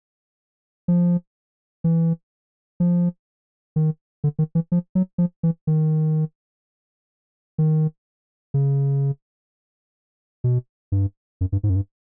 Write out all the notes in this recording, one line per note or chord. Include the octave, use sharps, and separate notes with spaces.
F3
E3
F3
D#3
D3
D#3
E3
F3
F#3
F3
E3
D#3
D#3
C#3
B2
G2
F#2
G2
G#2
F#2
G2